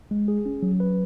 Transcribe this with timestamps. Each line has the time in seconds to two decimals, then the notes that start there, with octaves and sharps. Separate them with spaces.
0.11 G#3
0.28 G#4
0.46 C#4
0.63 F#3
0.80 B4